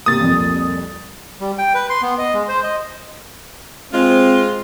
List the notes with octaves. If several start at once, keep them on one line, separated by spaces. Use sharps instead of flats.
C3 A#3 D#6 A6
C2 F2 A#2
G3
G5
B4
C6
B3
D#5
G#3
C5
D#5
G#3 C4 F4